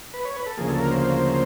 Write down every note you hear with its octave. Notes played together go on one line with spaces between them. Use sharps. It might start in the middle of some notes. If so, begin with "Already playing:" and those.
B4
C#5
B4
A4
D2 C#3 F3 A#3 G#4
A4
A#4
C5
C5